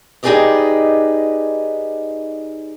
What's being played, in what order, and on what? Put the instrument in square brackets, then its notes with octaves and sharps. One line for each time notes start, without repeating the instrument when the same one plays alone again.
[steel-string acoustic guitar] D#4 G4 G#4 B4 D5 D#5